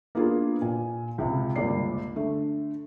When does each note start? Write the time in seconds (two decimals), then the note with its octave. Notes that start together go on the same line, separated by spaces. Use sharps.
0.15 A#3 B3 D4 F4 G#4
0.62 A#2 G#5
1.18 C#2 C3
1.56 G1 C#2 A#3 D5 C7
2.16 D3 A3